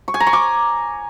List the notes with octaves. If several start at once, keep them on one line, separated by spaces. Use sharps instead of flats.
C#6
G#5
A#5
C#6
D6